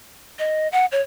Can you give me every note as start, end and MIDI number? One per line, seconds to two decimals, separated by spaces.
0.39 0.68 75
0.72 0.85 78
0.92 1.01 73